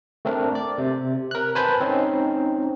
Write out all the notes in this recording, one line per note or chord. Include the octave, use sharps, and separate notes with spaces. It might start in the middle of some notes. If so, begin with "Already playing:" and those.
A3 C4 D4 A#4
D5
C3
A#4 F#6
B4 C5 G#5 A5 B5 G6
C4 C#4 D#4